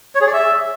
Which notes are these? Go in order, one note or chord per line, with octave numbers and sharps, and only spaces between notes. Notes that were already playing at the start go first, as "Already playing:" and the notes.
C#5
G#4
D5
E5